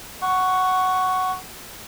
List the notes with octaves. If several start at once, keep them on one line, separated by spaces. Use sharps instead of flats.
F#5 C#6